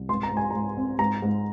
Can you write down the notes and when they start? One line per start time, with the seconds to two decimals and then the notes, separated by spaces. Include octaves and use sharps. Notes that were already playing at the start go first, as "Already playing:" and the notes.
Already playing: C2
0.09 G#2 C6
0.23 A#5
0.31 G#2
0.37 G#5
0.50 G#2 A#5
0.77 C4
0.99 G#2 A#5
1.22 G#2